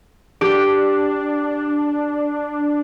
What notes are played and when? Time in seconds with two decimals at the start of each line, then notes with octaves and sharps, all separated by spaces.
0.41 D4 G4